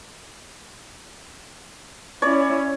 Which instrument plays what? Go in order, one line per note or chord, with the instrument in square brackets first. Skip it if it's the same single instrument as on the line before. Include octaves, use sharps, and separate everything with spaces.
[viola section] C#4 E4 [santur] C#5 D5